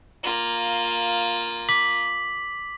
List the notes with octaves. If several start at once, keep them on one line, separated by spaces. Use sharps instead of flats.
A#3 F4
D6 B6 F#7